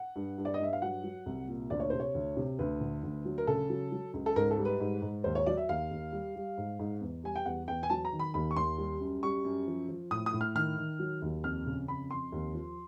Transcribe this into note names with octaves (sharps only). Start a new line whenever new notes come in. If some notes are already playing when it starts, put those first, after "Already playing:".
Already playing: F#5
G2
G2
D5
D#5
G2 E5
F5
F#3 F#5
F#3
C2
A#2
D2 D5
C#5
C3 C5
C#5
D2
C3
D2 B4
D3
D2
F#3
A#4
C#3 A4
F#3
F#3
C#2
A4
G#2 A#4
A4
G3
B4
G#2
G#2
D#2 C5
C#5
F#3 D5
E5
D#2 F5
D#2
G3
G3
G#2
G#2
E2
G3 G#5
G5
E2 F#5
E2 G5
G#5
F#3 A5
A#5
D#3
B5
D#2 B5
C#6
D#2 C6
G3
F#2
G3 C#6
F#2
F3
F3
A2 D#6
D#6
A2
F6
D#3 F6
D#3
F#3
D#2
F2 F6
C#3
F2 B5
F2 C6
D#2
F3